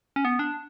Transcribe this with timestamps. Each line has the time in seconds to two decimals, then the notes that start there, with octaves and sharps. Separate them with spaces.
0.16 C#4
0.25 B3
0.39 D4